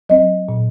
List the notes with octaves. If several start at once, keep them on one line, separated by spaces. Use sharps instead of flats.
F#3 C4 D#5
A#2